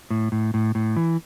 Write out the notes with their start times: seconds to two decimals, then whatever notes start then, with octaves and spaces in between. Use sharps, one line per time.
0.10 A2
0.32 A2
0.54 A2
0.75 A2
0.96 E3